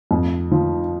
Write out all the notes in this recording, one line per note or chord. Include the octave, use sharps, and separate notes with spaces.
F2
F3